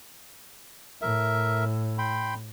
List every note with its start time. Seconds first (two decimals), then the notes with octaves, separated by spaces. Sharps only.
1.02 A2 A#4 E5
1.98 G5 B5 C6